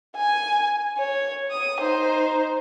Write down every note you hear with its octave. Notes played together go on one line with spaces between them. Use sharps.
G#5
C#5
D#6
D#4 C5